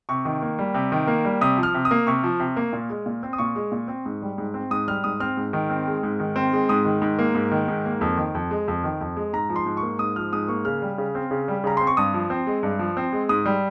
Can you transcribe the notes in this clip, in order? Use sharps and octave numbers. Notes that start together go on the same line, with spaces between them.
C3 C#6
D#3
A#3
G3
C3
D#3
A#3
G3
C3 D#6
F3
F6
C3
D#6
A#3
C3 C#6
F3
C3
A#3
A#2
G#3
A#2
C4
D#6
A#2 C#6
G#3
A#2
C4
G#2
G3
G#2
C4
G#2 D#6
G3 F6
G#2 D#6
C4 F6
G#2
D#3
C4
G#3
G#2
D#3
C4
G#3
G#2 D#6
D#3
G#2
A#3
G#2
D#3
G#2
A#3
F2
D#3
F2
G#3
F2
D#3
F2
G#3
G#2 A#5
F3
C6
G#2
C#6
A#3
G#2 D#6
F3 F6
G#2 D#6
A#3 C#6
C#3 F6
G3
C#3
C4
C#3
G3
C#3 A#5
C4 C6
C#6
G2 D#6
F3
C4
G#3
G2
F3
C4
G#3
G#2 D#6
G3